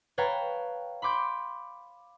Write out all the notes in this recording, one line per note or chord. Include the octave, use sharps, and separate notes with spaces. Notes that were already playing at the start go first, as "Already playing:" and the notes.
B4 C#5 F5 G5 A5 A#5
B5 C6 D6 G6